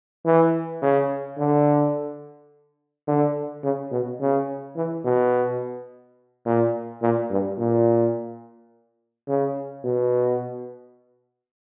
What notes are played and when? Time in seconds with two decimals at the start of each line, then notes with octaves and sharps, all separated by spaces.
0.25 E3
0.82 C#3
1.38 D3
3.08 D3
3.64 C#3
3.92 B2
4.21 C#3
4.76 E3
5.05 B2
6.46 A#2
7.02 A#2
7.30 G2
7.58 A#2
9.28 C#3
9.84 B2